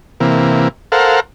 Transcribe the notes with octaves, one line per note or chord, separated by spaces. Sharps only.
C3 E3 A#3
A4 A#4 C5 F5 F#5